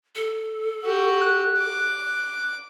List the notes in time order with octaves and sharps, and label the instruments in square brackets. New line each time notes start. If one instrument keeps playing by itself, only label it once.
[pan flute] A4
[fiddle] F#4 G4
[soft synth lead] F#6
[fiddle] D6